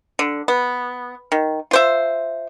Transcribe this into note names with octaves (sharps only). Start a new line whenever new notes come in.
D3
B3
D#3
F4 C5 E5